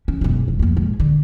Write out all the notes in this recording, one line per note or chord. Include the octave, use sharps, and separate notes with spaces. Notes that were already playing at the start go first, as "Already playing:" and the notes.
C#4
E1 F#2
F1
F2 A#3
A2 G#3
D3